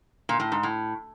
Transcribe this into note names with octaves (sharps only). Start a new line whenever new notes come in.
A#2
A2
G#2
A2